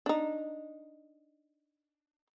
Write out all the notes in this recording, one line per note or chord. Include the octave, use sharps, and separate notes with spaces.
D4 D#4